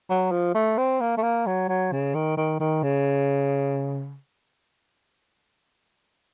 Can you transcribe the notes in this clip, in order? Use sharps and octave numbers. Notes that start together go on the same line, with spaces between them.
F#3
F3
A3
C4
A#3
A3
A#3
F#3
F#3
C#3
D#3
D#3
D#3
C#3